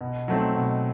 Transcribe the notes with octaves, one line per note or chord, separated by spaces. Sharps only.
B2
F#3 A3 C4 D#4
B2